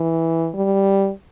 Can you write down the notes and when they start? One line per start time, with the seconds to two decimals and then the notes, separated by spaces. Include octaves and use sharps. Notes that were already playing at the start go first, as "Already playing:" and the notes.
Already playing: E3
0.55 G3